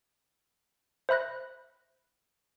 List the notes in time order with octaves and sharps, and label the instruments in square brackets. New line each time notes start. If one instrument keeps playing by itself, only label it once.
[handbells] C5 E5 B5 F#6 A#6